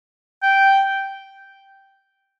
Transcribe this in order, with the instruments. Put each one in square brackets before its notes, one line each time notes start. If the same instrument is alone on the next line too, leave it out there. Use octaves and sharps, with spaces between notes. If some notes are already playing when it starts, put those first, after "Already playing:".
[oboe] G5